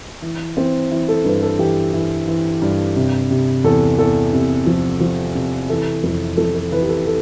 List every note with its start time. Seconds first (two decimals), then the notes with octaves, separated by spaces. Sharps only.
0.22 E3
0.57 E3 C4
0.91 E3 E4
1.08 A4
1.25 G2 B4
1.42 A4
1.59 E3 G4
1.93 E3
2.27 E3
2.62 G2
2.96 C3
3.31 C3
3.64 E2 A4
3.98 E2 A4
4.33 C3
4.66 F3
5.01 F3
5.35 C3
5.69 E3 A4
6.04 F2
6.37 F2 A4
6.55 A4
6.72 E3 B4
6.82 G4
6.89 A4
7.07 A4